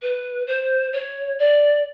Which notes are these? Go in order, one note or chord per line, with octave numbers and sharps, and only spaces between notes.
B4
C5
C#5
D5